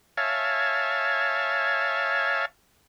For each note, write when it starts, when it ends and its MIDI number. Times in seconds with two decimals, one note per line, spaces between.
0.17 2.45 73
0.17 2.45 76
0.17 2.45 77
0.17 2.45 80
0.17 2.45 81